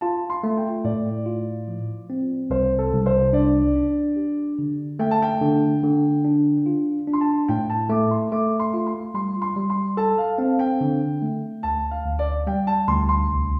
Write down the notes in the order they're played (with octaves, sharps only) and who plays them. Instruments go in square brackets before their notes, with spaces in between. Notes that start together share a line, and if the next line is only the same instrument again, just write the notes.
[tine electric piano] F4 [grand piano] A5
[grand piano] C6
[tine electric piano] A3
[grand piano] G5
[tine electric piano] A2 [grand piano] D5
[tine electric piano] F4
F3
C4
[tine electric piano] C2 [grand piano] C5
[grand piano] A4
[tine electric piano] C2
[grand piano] C5
[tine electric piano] D4 [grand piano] D5
[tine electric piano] D4
G4
D3
[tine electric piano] A3 [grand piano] G5
[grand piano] A5
G5
[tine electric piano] D3
D3
D4
F4
D4
[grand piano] C6
A5
[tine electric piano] A2 [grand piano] G5
[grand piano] A5
[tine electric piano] A3 [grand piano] D6
[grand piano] C6
[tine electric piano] A3 [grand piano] D6
[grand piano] C6
[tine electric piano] F4
[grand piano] C6
[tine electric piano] G3 [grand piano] C6
[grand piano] C6
[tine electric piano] G3
[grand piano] C6
[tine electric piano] A4 [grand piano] A5
[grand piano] F5
[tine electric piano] C4 [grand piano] F5
[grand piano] G5
[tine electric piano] D3
A3
[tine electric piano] D2 [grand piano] A5
[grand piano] F5
[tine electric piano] D2
[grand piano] D5
[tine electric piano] G3 [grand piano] G5
[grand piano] A5
[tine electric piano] D2 [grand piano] C6
[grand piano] C6
[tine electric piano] C2